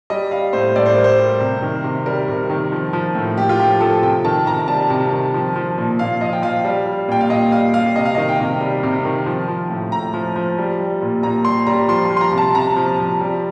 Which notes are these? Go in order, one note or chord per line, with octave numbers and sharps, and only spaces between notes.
G3 D#5
G3 F5
A2 C5
A2 D5
C5
G3 A#4
C5
G3
C3
D#3
C3
G3 A#4
C3
D#3
F3
F3
A2
A2 G4
F4
F3 G4
F3 A4
C3 G5
D#3 A5
C3 A#5
G3 A5
C3
D#3
F3
F3
A#2
A#2 F5
F3 D#5
G5
F3 F5
G3
G3
A#2 G5
F5
A#2 D#5
G3 F5
G3 F5
C3 D#5
F5
D#3 D#5
G5
C3
G3
C3
D#3
F3
F3
A2
A2 A#5
F3
F3
G3
G3
A#2
A#2 A#5
G3 C6
G3 A#5
F3 C6
C6
F3
C6
A#5
C3 A5
C3 A#5
F3
F3
G3